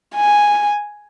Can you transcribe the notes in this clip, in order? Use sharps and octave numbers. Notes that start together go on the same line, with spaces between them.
G#5